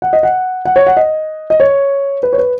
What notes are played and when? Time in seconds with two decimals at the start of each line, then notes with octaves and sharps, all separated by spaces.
0.02 F#5
0.13 D#5
0.23 F#5
0.65 F#5
0.76 C#5
0.87 F#5
0.97 D#5
1.50 D#5
1.60 C#5
2.23 B4
2.33 C#5
2.38 B4